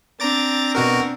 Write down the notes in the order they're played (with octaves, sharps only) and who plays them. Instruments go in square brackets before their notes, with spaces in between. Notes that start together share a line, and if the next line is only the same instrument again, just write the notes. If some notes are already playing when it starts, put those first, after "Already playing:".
[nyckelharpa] C4 D4 [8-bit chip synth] A#5 D6 A6
[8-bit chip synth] B2 F#4 A#4